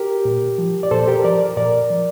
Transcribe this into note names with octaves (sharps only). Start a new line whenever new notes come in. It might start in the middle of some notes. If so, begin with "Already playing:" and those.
Already playing: G4 A#4
A#2
F3
D5
A#2 A4 C5
G4 A#4
F3 A#4 D5
A#2 A#4 D5
F3